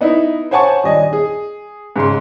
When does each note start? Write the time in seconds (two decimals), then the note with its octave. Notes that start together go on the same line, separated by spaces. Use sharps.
0.01 B3 D#4 E4
0.51 C5 C#5 F#5 G#5 A5 C#6
0.83 D#1 D4 D#5 G#5
1.13 G#4
1.96 G#2 C#3 C6